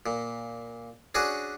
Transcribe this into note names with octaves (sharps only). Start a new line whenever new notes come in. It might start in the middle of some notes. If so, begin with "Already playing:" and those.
A#2
C#4 D4 F#4 G#4